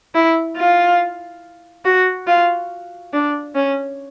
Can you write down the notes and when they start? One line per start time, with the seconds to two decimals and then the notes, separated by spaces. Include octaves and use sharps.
0.15 E4
0.57 F4
1.85 F#4
2.27 F4
3.13 D4
3.55 C#4